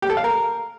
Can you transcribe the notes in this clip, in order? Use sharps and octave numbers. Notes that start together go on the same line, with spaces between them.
G4
A4
F5
A#4